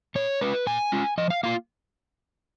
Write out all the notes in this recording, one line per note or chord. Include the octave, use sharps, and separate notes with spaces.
A#2 C#5
G#3 C#4 F4 B4
A#2 G#5
G#3 C#4 F4
F3 D#5
F5
A#3 F4 F5